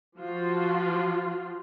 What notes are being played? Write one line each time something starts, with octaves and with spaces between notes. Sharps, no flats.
F3 F4 F#4